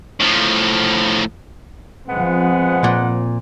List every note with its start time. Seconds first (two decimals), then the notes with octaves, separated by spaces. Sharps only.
0.20 A2 F3
2.10 F3 G#3 B3 C4 F#5
2.84 A#2